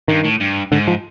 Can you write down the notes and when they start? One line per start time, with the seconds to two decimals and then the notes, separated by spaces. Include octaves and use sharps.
0.08 G2 D#3
0.24 A2
0.40 G2
0.72 G#2 D3
0.88 F3